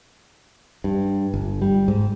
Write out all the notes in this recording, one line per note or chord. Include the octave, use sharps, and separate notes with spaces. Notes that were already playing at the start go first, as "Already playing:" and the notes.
G2
G1
G3
G#2